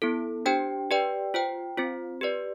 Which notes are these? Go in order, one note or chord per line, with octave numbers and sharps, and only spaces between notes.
B3 E4 A4
D4 G4 C5 G5
G4 B4 D5 G5
F4 C5 G5
C4 F4 C5
G4 B4 D5